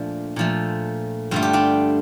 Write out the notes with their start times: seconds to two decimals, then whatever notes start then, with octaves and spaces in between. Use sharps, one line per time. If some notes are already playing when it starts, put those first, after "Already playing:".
Already playing: A#2 F3 A3 D4
0.36 A#2 F3 A3
1.31 G2 D3 A3 F4
1.42 G4
1.53 D4 F4